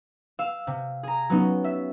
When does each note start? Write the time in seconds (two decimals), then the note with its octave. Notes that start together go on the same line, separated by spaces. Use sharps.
0.39 F5 E6 E7
0.67 C3
1.03 G#4 A#5
1.30 F#3 B3 C#4 D#4
1.64 E5